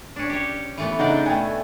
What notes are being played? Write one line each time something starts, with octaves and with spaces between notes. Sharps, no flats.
C#4 D4
G4 C#5
E3 A3 B3
C#3 D4 D#4 D5 F#5
B2 A3 G5 G#5